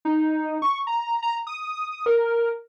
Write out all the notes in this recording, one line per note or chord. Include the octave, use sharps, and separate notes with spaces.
D#4
C#6
A#5
A#5
D#6
A#4